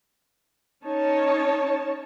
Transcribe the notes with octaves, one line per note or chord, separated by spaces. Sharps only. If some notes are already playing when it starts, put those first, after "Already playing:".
C#4 D#4 C#5 A5